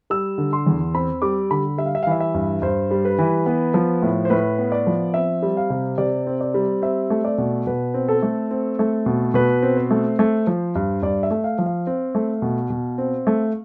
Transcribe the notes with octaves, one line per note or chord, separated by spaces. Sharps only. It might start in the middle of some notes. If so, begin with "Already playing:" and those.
G3 E6
D3
C6
E2
C4 B5
G3 D6
D3 B5
G3 E5
F5
E5
F5
E3 E5
E5
G2
G2 C5
G3
B4
E3
B3
F3
A2
C5
A2 B4
B3
D5
F3
C4 E5
G3
F5
C3
C3 D5
C4
D5
G3
C4 E5
A3
D5
B2
B2 B4
C4
A4
A3
C4
A3
B2
B2 B4
C4
C5
A3
A3
F3
G2
G2 D5
E5
A3
F5
F3
F5
C4
A3
B2
B2
C4
A3